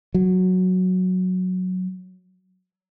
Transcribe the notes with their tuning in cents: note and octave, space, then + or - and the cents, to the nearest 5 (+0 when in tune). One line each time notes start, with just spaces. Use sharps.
F#3 -5